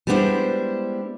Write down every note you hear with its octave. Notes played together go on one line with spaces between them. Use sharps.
G3 G#3 B3 D4 E4 C5